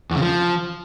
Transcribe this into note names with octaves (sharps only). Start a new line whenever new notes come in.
E2
C#3
F3